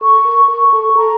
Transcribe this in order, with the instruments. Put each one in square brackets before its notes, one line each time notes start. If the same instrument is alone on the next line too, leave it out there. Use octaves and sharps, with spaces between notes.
[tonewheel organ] A4 [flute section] C#6
[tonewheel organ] A#4
[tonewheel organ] A#4 [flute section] C#6
[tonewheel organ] A4
[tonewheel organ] A4 [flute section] A#5